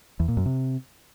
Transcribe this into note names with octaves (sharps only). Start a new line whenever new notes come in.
E2
A#2
F#2
C3